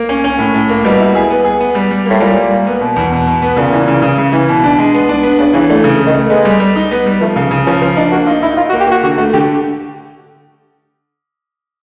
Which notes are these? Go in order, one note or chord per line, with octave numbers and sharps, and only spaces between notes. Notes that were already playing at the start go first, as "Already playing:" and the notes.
Already playing: A#3
C#4
C#4
A2
A2
A#3
B2 G3
E4
G#4
B3
G#4
B3
G3
G3
A2 A#3
A#2 G3
G3
A#3
B3
B2
E2
B2
B2
B3
A#2 C#3
E3
C#3
C#3
C#3
E3
B2
D4
G#3
B3
D4
B3
C#3 D4
C#3 E3
D3 A3
C#3
A3
D#3
A3
G#3 B3
G3
G3
D#4
B3
G3
F3 A3
C#3 A#3
C#3
F3 C#4
F3
D4 D#4
A#3 F#4
D#4 F4
D#4 E4
D#4 F4
F#4
A#3
G4
A#3 F#4
D3 F#4
A3 F#4
D3 G4